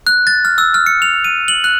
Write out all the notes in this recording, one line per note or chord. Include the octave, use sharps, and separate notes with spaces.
F#6
A6
F6
E6
F6
C#7
F7
D#7
F#7
F#6